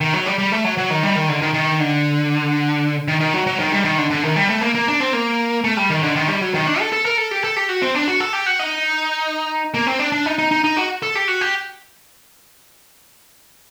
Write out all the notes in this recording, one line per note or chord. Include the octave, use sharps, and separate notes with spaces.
D#3
F#3
G3
G3
A3
F#3
F#3
D#3
G3
D#3
D3
D#3
D#3
D3
D#3
D#3
F#3
F#3
D#3
G3
D#3
D3
D3
D#3
G3
A3
A#3
A#3
D4
C4
A#3
A3
G3
D#3
D3
D#3
G3
F#3
D#3
D4
A4
A4
A#4
A4
G4
A4
G4
F#4
C4
D4
F#4
A4
G4
F#4
D#4
A#3
C4
D4
D4
D#4
D#4
D#4
D#4
F#4
A4
G4
F#4
G4